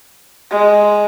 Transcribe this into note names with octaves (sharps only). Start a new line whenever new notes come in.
G#3